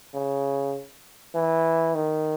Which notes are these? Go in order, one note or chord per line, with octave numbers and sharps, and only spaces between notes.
C#3
E3
D#3